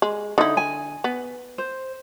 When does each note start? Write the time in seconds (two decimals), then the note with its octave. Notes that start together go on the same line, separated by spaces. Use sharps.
0.02 G#3
0.38 D3 D#4 E4
0.57 G#5
1.04 B3
1.58 C5